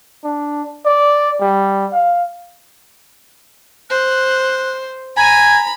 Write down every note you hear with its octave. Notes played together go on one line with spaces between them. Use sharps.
D4
D5
G3
F5
C5 F#6
G#5 A#5 B5